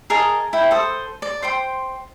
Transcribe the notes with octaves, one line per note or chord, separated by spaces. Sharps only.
G#4 A#4 D#5 A5
E4 G5
A4 C5 D#6
D5
C5 G5 C6